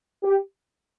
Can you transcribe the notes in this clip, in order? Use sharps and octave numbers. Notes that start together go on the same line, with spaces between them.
G4